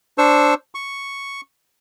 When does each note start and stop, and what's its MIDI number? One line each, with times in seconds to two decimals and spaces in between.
0.18 0.54 62
0.18 0.54 72
0.18 0.54 85
0.18 0.54 88
0.75 1.41 85